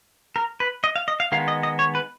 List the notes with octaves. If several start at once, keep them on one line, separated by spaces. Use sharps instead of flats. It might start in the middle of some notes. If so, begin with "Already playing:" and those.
A#4
B4
D#5
F5
D#5
F5
D#3 G#3 B3 F5
D#5
D#5
C#5
B4